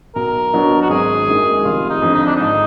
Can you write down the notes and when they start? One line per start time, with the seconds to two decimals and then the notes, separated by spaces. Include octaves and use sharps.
0.15 B1 A#4
0.53 B2 F#3 D4
0.82 F#4
0.90 G#1 G#4
1.27 F#2 D#3 G#3
1.64 F1 F4
1.90 D#4
2.02 F2 D3
2.14 D#4
2.26 D4
2.36 G#2 D#4